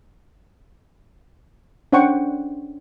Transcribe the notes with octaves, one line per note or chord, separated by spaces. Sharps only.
C#4 D4 C5 F#5 G5 C#6